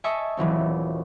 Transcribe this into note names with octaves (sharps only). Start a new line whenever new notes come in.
D#5 E5 G#5 A5 C#6
D#1 E3 F#3 C4